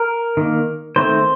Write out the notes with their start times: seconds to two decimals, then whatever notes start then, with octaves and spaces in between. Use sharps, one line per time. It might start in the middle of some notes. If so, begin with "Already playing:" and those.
Already playing: A#4
0.37 D#3 A#3
0.96 D#3 A3 C4 C5